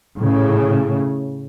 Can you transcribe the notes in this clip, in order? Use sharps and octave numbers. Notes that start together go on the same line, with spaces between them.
A2 C#3